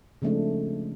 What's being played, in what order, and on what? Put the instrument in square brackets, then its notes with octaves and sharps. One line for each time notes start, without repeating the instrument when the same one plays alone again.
[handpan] C#3 F3 G#3 A3 C4 D4